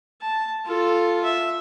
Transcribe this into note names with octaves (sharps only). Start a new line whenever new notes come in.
A5
F4 A4
E5